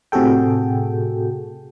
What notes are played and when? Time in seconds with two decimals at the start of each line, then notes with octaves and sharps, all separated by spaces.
0.12 A2 C3 F#4 G#4 A4 G5